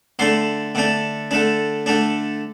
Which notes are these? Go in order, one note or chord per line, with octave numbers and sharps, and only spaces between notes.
D3 A3 D4 C6
D3 A3 D4
D3 A3 D4
D3 A3 D4